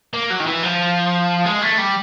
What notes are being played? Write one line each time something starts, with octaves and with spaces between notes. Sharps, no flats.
A#3
F#3
D#3
E3
F3
G#3
A3
G3